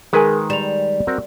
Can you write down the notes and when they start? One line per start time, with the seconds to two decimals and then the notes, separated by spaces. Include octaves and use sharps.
0.13 D#3 G#3 G#4 A#4 B4 G#5
0.50 G3 E7 F7
1.07 C4 F#4 A#4